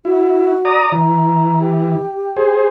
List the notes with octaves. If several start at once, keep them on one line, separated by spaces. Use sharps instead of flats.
E4 F#4
D5 A#5 D#6
E3 A#5
G4
G#4 C5